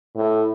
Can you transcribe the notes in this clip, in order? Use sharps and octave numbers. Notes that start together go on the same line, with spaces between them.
A2